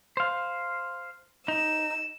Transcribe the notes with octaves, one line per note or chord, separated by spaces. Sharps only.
C5 F5
D#4 E6